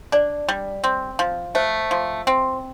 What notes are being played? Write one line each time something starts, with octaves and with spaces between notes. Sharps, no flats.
D4 D5
G3
C4
F3
A3 C5
F3
C4